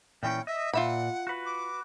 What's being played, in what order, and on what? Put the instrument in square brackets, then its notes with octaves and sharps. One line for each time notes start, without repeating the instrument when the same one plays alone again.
[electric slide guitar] A#2 E3 C#4 [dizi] G5
[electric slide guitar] D#5 [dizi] E5
[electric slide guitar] A#2 [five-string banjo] F4 E5 B5 [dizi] F#5
[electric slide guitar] F#4 B4
[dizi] D6